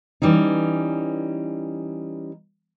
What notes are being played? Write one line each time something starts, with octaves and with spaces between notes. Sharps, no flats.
E3 G3 C#4 D#4